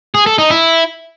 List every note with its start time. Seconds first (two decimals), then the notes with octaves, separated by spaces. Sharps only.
0.15 G#4
0.26 A4
0.38 D#4
0.50 E4